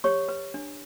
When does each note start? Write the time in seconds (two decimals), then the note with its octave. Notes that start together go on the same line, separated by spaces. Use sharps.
0.04 G4 C#5 C#6
0.29 B4
0.54 D4